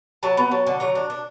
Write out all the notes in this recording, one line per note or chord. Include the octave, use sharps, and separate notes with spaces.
F#3 A5
B3 A#5
F#3 A5
D3 A5
F#3 A#5
D4
D4